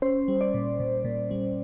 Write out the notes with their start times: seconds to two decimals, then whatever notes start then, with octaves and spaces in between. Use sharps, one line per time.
0.02 C#4 C5
0.28 G3
0.41 D5
0.54 A#2
0.80 A#2
1.05 A#2
1.31 G3